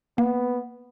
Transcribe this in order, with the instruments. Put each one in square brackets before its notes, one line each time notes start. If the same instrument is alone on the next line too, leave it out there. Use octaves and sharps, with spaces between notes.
[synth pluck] A#3 [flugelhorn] B3